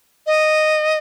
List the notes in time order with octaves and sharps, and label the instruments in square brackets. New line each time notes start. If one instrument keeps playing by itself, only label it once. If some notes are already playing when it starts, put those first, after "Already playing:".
[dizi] D#5